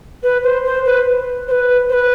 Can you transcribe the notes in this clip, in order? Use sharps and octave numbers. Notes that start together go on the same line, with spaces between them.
B4
C5
C5
B4
C5
B4
C5
B4